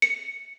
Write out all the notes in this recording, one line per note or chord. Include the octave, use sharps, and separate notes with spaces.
C#7